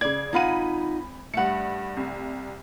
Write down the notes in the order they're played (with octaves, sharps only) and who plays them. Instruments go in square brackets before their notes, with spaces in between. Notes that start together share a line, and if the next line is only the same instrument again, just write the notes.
[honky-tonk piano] C#3 G#6 [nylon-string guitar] D5
[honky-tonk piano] G#1 B5 D#7 [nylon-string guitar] D#4 F4 F#5
[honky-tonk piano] G2 C#7 [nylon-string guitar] A3 F#5
[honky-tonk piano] C2